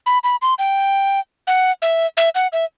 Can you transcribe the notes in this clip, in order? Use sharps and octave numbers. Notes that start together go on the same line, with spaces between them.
B5
B5
C6
G5
F#5
E5
E5
F#5
E5